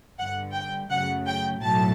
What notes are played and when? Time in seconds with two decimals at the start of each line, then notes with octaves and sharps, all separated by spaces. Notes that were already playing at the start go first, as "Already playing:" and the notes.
0.18 G1 G2 D3 F#5
0.54 G5
0.90 F#2 C#3 F#3 A3 F#5
1.26 G5
1.62 B1 A2 F#3 A3 A5